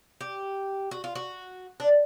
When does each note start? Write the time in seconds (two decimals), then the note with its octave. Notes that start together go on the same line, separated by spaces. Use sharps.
0.21 G4
0.91 F#4
1.04 F4
1.15 F#4
1.80 D4